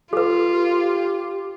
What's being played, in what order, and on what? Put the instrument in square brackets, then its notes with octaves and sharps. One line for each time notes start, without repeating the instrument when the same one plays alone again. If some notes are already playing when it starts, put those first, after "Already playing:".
[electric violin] F4 [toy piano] A4 B4
[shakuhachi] G4